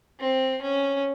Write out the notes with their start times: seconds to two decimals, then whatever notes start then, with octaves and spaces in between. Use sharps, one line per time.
0.20 C4
0.62 C#4